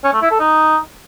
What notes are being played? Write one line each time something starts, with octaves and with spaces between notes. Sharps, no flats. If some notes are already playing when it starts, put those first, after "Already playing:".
C#4
A3
E4
A4
D#4